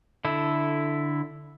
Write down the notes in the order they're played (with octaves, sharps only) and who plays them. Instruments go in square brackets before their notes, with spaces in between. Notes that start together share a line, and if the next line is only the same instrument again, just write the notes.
[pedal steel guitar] D3 E4 A4